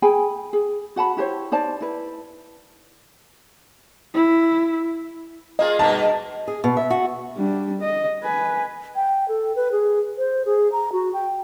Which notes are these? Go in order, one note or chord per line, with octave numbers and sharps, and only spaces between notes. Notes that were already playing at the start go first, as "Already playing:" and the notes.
G#4 G5 G#5 B5
G#4
F#4 F#5 A5 B5
E4 G4 C5 C#5
D#4 C5 D5 A5
E4 B4
E4
A#3 F4 G#4 D#5
G2 B2 A#3 A5
G#4
B2
E5
F#4
G3 D4
D#5
B4 G#5
G5
A4
B4
G#4
C5
G#4
A#5
F#4
G5